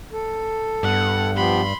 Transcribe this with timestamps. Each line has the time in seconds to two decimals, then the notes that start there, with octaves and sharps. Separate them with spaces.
0.12 A4
0.83 G2 B3 F#5
1.36 F3 B3 G4 B5 C6